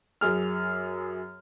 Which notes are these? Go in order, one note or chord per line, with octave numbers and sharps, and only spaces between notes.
F#2 G#4 F6